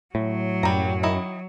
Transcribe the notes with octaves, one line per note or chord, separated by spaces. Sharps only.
A2 F#3
F#2 G3 A#5
D#3 E4 D#5